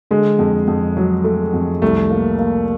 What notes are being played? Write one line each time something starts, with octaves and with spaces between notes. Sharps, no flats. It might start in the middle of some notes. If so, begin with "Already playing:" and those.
D3 G#3
F2
F2
F#3
A3
F2
C2 A3
A#3
A#3